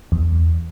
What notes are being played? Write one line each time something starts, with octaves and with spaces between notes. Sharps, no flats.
E2